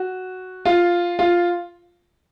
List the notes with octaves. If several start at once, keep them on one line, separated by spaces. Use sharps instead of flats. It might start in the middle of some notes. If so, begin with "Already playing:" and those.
Already playing: F#4
F4
F4